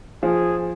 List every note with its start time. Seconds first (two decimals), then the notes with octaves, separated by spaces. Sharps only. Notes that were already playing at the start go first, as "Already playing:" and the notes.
0.23 F3 G#4